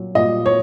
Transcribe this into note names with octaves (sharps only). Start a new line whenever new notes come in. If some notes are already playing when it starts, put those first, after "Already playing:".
Already playing: A#2 F#3
A#2 D#5
C#5